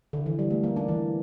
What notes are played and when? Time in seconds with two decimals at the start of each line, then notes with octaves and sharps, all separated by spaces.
0.13 D3
0.26 E3
0.39 G3
0.50 A3
0.63 A#3
0.76 D4
0.88 E3